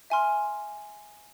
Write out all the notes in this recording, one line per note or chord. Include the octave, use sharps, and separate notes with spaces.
E5 G#5 C6 F6